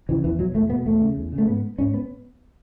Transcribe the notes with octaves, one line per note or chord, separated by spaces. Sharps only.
C#3 E3
E2 E3
B2 F#3
E2 A3
B2 B3
E2 A3
C#3
E2
C#3
A3
G#2 B3
G#2 C#4
B3